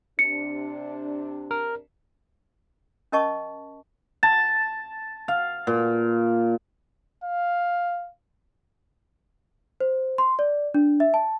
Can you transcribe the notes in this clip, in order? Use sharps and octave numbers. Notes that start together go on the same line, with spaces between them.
C3 D4 C#7
A#4
C#4 A#4 D#5 A5 C#6
A5
F5
A#2
F5
C5
C6
D5
D4
E5
A5